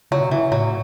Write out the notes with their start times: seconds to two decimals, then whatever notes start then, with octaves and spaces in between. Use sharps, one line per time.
0.11 C#3 F#3
0.21 B2
0.30 C#3 E3
0.51 A2 F#3